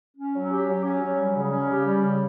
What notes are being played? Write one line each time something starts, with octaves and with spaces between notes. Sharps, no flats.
C#4
F#3
G4
F#3
C#4
F#3
G3
C#3
C#4
G4
G3
C#3